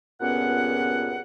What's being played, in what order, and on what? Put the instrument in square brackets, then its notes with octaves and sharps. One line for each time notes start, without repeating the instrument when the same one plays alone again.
[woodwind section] C#2 G2 A#2 B3 C#4 F#5